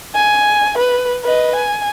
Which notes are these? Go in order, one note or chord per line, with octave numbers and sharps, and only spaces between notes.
G#5
B4
B4 D#5
G#5